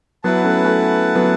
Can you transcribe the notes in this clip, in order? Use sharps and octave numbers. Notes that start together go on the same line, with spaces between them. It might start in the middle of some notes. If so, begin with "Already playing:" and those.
F#3 B3 E4 B4 F#5 A5
A3 C#4
A3 C#4
F#3 B3